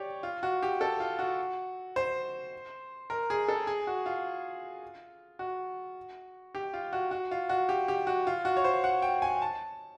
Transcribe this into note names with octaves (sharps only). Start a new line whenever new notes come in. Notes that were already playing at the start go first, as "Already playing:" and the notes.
Already playing: G4 C#5 D5
F4
F#4
G4
A4
F4
F#4
C5
A#4
G#4
A4
G#4
F#4
F4
F#4
G4
F4
F#4
F#4
F4
F#4
G4
G4
F#4
F4
F#4
C#5
C5
F#5
G5
G#5
A5